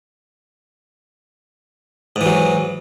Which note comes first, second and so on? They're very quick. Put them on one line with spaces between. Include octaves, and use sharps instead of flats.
G#2 E3 F#3